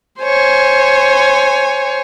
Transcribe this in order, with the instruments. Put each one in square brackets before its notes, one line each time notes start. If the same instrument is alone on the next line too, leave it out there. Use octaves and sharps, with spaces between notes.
[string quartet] C5 C#5 G#5